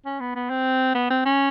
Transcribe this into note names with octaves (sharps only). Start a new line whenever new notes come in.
C#4
B3
B3
C4
B3
C4
C#4